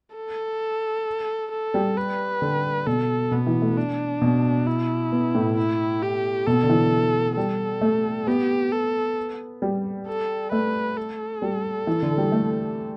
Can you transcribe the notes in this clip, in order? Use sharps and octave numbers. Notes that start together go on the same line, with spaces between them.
A4
A4
G3
B4
D3
B2 A4
B2 B3
E3
A3
D4
B2
E4
B3
A2
E4
G4
B2 A4
D3
E3
G3 A4
A3
B3 G4
A4
G3
A4
A3 B4
A4
G3
E3
D3
G3
A3